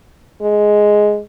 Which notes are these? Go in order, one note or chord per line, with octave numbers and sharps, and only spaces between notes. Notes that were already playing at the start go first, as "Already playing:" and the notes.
G#3